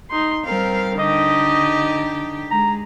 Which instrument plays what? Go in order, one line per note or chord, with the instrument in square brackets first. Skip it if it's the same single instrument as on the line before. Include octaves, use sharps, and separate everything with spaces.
[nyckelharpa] D#4 C6
[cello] G3 F5 [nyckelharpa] C4 A#4
[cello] D3 G4 [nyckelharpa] D#4 D6 [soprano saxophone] D#5
[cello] G#3 [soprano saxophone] A#5